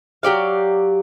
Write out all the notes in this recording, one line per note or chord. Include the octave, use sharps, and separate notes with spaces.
F#3 G4 D5 F5